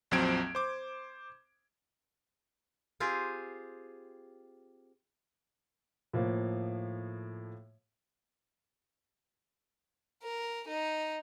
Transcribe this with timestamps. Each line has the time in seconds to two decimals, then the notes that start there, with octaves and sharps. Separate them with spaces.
0.11 A#1 F2 F#3 C4 G#6 D7
0.55 C5 D6
3.00 C4 F4 G4 G#4
6.13 A2 F3 A#3
10.23 A#4
10.68 D#4